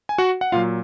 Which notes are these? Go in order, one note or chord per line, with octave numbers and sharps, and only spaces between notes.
G#5
F#4 F#5
F#5
A#2 F#3 F4 F5